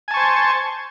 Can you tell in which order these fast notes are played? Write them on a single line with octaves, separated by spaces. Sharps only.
G#5 A5 C#6 C5